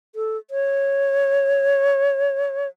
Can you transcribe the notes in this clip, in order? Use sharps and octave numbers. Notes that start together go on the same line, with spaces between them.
A4
C#5